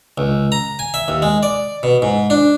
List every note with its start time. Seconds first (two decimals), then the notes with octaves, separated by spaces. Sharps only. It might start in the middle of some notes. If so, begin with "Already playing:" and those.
0.18 C#2
0.52 A#5
0.79 G#5
0.94 E5
1.08 D#2
1.22 G#3
1.43 D5
1.83 B2
2.02 G#2
2.30 D4